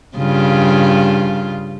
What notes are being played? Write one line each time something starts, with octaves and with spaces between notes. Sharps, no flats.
G2 C#3 F4